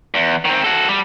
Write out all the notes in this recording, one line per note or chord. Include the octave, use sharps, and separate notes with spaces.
E2
D#3 C4
F#4 A4
G3